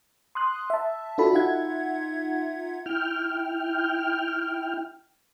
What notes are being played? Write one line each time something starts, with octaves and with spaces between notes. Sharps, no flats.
C6 D#6 F#6
E5 A5
D4 F4 F#4 A4 A5 B5
D#4 F4 E5 F#5 G#6
E4 G5 F6